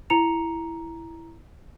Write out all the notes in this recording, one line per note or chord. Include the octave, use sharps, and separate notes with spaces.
E4 A#5 C#7 F7